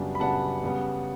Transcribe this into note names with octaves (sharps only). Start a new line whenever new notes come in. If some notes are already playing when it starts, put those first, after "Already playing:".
Already playing: F#2 C#3 G3 B3 D4
B5
F#2 C#3 G3 B3 D4 F#5 A5
C#3 G3 B3